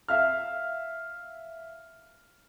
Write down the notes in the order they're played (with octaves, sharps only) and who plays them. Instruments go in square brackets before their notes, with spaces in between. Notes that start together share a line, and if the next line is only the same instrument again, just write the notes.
[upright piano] E5 F5 F6